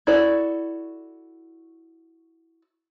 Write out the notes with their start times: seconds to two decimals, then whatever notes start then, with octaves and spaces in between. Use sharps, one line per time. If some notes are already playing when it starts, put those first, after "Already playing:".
0.07 E4 F#4 A4 D5